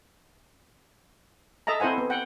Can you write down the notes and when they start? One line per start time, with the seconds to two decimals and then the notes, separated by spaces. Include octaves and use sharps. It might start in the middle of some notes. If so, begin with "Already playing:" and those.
1.67 A4 D#5 E5 A5 A#5
1.80 C4 E4 A4 C5 F#5 G#5
1.98 B3
2.10 F#5 G5